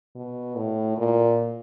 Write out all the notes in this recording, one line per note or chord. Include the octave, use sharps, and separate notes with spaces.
B2
A2
A#2